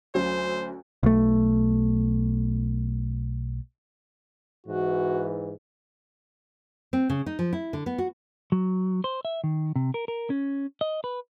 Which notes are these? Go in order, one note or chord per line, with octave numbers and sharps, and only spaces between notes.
D2 F#3 C#4 C5
B1 A3
G#2 E3 F#4
C4
C#3
D#4
F3
E4
D3
B3
F#4
F#3
C5
E5
D#3
C3
A#4
A#4
C#4
D#5
B4